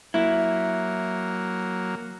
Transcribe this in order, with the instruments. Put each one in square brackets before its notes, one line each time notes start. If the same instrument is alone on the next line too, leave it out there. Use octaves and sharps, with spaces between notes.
[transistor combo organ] F#3 A#3 [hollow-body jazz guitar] E4